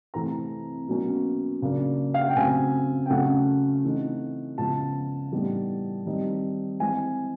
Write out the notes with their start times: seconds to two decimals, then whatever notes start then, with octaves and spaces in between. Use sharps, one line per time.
0.14 C3 E3 A3 C4 A#5
0.88 B2 F#3 A#3 C#4
1.62 C#3 F#3 A#3 D4
2.14 F5
2.21 F#5
2.29 G5
2.36 C#3 F#3 A3 C4 G#5
3.06 G5
3.10 C#3 F#3 A3 C#4 F#5
3.85 E3 A3 C4 D#4
4.58 C#3 F3 G#3 B3 A5
5.32 A2 E3 G3 B3 D#4
6.06 D#3 G3 C4 D#4
6.80 E3 G#3 C4 G#5